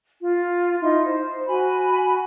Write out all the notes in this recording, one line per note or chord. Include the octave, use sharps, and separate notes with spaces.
F4
D#4 E4 C6
C5
F#4 G#5 B5